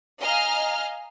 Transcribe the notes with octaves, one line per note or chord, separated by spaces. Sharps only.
D#5 F5 G#5 A#5 F6